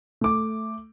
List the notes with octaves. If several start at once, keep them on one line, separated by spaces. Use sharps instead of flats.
A3 D6